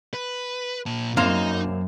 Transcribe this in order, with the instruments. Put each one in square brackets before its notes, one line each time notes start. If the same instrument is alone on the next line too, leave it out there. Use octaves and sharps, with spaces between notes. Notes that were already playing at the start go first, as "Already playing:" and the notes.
[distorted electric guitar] B4
A#2 A5
[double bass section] F#2 [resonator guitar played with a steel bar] A#3 C4 F5 [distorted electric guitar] D#4